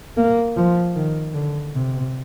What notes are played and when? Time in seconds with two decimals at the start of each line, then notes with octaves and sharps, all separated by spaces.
0.17 A#3
0.57 F3
0.96 D#3
1.34 D3
1.75 C3